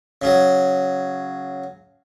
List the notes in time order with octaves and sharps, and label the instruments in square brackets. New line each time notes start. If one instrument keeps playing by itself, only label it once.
[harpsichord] C#3 F#3